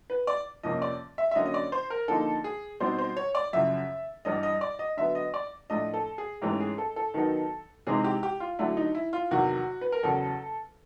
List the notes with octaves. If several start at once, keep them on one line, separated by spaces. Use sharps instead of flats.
B4
D5
F2 C3 F3 A#3 C#4 D#5
D5
E5
E5
D3 F#3 A#3 C#4 D#5
D#5
D5
C5
A#4
D3 F3 A#3 D#4 A4
G#4
B2 G3 C4 D#4 C5
C5
C#5
D5
F#2 C#3 F3 E5
G2 E3 G3 D#5
D#5
D5
D#5
D3 F#3 B3 E5
D#5
D5
A2 F3 A3 D4 D#5
A4
G#4
G#2 E3 A3 C#4 G4
G#4
A4
A4
D#3 F#3 B3 D#4
C3 E3 G#3 C4 D#4 G#4
G4
G4
F4
D3 F#3 A3 D4 E4
D#4
E4
F4
E2 C3 D#3 F#3 F#4
B4
A#4
E2 C#3 F#3 A4